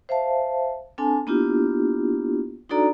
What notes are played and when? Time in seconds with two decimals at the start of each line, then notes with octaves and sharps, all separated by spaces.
0.09 C5 E5 F5 A5
0.98 C4 D4 A4 G#5 A5
1.27 A#3 B3 D4 E4 F4 G4
2.70 D4 D#4 F#4 A4 D5 A#5